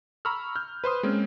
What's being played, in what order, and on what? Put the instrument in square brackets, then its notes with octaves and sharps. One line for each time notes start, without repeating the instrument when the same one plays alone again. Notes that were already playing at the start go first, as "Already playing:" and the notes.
[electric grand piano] A#5 B5 C#6 E6 F6
F6 G6
B4 C5 C6 D#6
G#3 A#3 C4 C#4